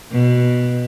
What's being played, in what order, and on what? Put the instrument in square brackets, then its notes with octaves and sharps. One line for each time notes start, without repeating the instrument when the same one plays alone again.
[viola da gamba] B2